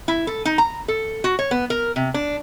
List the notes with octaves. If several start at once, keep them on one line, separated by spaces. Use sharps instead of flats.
E4
A4
D#4
A#5
A4
F#4
C#5
B3
A#4
C3
D4